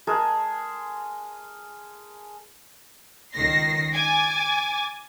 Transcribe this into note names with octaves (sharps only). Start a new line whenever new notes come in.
G#3 G#4 A#4 A5
C#2 D#3 A#6 C7
G#5 D6 A6